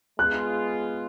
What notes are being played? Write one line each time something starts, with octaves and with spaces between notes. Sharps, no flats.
G#3 B3 F4 G#4 F#6